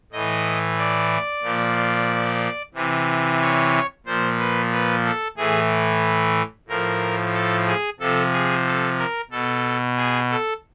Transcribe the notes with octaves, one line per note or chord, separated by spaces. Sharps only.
A2 E3 D#5
D5
A#2 F3
C3 E3
C#5
A#2 F3 C5
B4
B4
A4
A2 E3 G#4
A2 F3 A#4
A4
G#4
C3 F3 A4
G#4
A4
A#4
B2 A4
G#4
A4